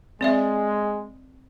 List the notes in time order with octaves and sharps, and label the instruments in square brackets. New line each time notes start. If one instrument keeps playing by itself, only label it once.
[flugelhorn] G#3 [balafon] C4 D5 E5